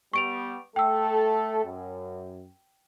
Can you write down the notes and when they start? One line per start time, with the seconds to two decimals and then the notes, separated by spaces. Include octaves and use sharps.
0.13 G3 B3 C#6 D7 F7
0.76 A3 A4 G5 E6
1.64 F#2